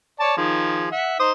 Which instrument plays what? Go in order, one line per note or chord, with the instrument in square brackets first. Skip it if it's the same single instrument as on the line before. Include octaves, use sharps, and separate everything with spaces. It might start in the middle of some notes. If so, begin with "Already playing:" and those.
[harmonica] C#5 D5 A5
D#3 F3 G#4
E5 F#5
D#4 C5 D#6